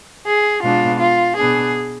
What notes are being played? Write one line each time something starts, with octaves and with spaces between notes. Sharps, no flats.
G#4
B2 G#3 B3 D4 F4
F4
B2 B3 D4 G#4